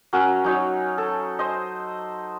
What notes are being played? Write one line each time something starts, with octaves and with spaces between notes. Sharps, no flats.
F#3 C#4 A#4 F#5
F#3 D#4 C#5
A4
C5 D#5